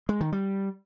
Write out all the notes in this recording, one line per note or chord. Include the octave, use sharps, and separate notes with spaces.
G#3
D#3
G3